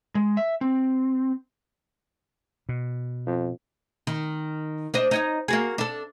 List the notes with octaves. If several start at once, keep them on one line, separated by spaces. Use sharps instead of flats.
G#3
E5
C4
B2
F2
D#3
D4 C5 D#5
D#4 C#5 D#5
A#3 F#4 G#4
D4 A4